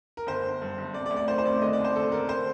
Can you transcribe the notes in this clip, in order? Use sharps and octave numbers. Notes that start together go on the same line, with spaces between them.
A#4
G1 C5
G1
G2
G1
C3 D5
D5
D2
D5
D#3 C5
C5
C3 D5
D3 D#5
D5
D#2
C5
D3 A4
D3 A#4
C5